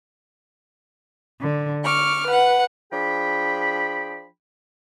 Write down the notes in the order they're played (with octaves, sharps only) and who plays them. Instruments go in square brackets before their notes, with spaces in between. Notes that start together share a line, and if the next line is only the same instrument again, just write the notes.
[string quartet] D3
C#6 D6 F6
B4 F#5
[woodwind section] F3 D4 G#4 G5 B5